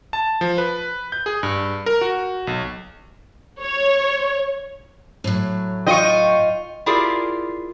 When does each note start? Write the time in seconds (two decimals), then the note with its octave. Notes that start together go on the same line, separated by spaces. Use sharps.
0.13 A5
0.41 F3
0.58 B4
1.12 G6
1.26 G#4
1.43 G2
1.86 A#4
2.01 F#4
2.47 B1
3.60 C#5
5.24 A2 F#3
5.87 F4 D#5 G5 C#6
6.86 E4 F4 G4 G#4 A#4 D5